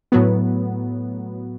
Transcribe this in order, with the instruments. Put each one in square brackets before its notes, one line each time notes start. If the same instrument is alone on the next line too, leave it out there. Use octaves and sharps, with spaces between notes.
[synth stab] A2 F#3 B3